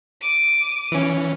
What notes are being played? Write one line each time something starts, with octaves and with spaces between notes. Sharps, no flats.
D6 D#7
E3 C#4